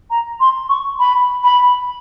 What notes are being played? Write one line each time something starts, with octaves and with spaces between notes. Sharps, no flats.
A#5
C6
C#6
B5
B5